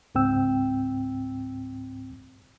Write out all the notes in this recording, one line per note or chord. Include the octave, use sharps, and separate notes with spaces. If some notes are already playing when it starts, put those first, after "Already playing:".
C#2 G#2 C4 G5 E6